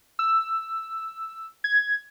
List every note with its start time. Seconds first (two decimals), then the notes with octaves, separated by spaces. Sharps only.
0.19 E6
1.64 G#6